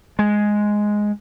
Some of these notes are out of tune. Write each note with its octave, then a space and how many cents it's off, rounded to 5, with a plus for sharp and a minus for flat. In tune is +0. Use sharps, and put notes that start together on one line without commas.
G#3 +5